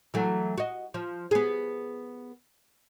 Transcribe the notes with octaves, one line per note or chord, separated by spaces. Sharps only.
E3 F#3 A3
F#4 D#5
F3
B3 G#4